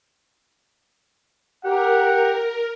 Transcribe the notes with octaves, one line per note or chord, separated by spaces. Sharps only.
G4 A#4 F#5